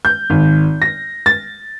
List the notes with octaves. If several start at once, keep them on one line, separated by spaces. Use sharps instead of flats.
G6
G#1
A#6
A6